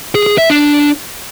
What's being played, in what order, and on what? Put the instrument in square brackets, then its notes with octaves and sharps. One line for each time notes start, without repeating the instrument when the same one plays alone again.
[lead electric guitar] G#4
G#4
E5
D4